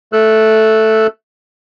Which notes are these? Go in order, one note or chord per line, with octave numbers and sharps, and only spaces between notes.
A3 A4 E6 F#6